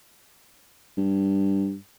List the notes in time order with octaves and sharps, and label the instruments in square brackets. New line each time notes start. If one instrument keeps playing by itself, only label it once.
[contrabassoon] G2